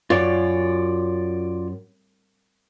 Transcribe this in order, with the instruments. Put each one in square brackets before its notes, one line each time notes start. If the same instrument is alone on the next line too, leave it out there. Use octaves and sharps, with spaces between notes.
[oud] F#2 [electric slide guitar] F4 C#5 D5